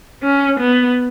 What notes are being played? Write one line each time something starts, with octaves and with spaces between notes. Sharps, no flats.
C#4
B3